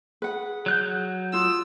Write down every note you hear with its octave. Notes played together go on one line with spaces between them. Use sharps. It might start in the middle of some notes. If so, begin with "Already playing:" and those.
G#4 B4 F#5
F#3 F#6 G6
F4 D#6 E6